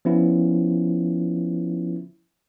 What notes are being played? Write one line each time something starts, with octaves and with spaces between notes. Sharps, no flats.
F3 B3 C#4 E4 F4